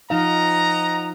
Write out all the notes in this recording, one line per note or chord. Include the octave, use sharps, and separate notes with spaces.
F3 D#4 D#5 F5 F#5 A#5